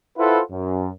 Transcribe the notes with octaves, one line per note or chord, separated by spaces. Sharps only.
E4 F4 A4 B4 C5 F#5
F#2